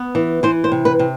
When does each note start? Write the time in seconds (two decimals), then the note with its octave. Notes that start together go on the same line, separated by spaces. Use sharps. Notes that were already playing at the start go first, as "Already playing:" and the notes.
Already playing: B3
0.15 E3
0.43 E3 C5
0.64 C5
0.72 C3
0.85 B4
0.99 C3